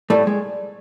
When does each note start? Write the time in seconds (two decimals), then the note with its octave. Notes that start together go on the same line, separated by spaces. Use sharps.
0.10 A2 G3 A3
0.27 G#3